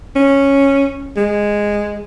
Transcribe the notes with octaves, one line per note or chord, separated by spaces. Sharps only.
C#4
G#3